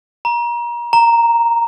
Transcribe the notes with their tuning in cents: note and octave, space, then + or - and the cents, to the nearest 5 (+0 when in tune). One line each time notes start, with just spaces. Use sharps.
A#5 +30
A#5 -5